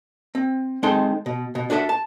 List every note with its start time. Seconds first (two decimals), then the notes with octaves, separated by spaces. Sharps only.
0.35 C4
0.83 G#3 C4 D#4 A4 C6
1.26 B2
1.55 B2
1.70 D4 F#4 A4 D#5 E5
1.89 A5